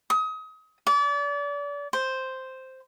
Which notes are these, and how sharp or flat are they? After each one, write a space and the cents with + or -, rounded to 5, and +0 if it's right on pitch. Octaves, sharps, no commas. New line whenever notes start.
D#6 +30
D5 -35
C5 +0